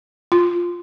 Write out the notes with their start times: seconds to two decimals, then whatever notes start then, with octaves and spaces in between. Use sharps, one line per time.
0.32 F4